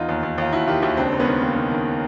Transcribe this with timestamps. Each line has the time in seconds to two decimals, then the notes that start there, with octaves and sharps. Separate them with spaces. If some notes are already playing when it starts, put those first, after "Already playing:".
Already playing: E2 D#4 F4
0.09 D#2
0.23 D#2
0.38 D#2 F4
0.53 D#2 E4 F#4
0.67 D#3 F4 G4
0.82 D#2 E4 F#4
0.97 C#2 C4 D4
1.12 C#2
1.20 B3 C#4
1.27 D#3
1.42 D#3 A#3 C4
1.56 D#3
1.72 D#3